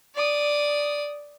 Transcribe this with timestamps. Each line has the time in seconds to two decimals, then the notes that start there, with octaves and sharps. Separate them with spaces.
0.15 D5 D#6